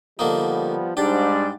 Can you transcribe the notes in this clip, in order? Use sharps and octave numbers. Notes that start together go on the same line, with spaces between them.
D3 F3 G3 A#3 B3 D#4
G#2 G3 D4 G4 D5